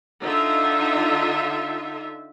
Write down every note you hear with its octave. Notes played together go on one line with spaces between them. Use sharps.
D3 D#4 F4 E5